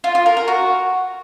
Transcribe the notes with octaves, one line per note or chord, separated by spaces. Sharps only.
F4
F4
A#4
A#4
F#4